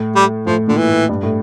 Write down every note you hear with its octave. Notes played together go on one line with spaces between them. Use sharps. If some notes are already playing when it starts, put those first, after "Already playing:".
Already playing: A2
G3
A2 F3
A#2 D3
E3
A2
G2
A2